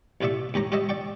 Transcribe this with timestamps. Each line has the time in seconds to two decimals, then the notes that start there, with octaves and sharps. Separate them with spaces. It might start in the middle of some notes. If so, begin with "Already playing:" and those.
0.21 A1 C3 F4 D5 E5 C#6
0.54 D#2 G4 C#5 A#5 D6
0.72 F4 G4 C#5 D#5 E5
0.89 D5 G5 C#6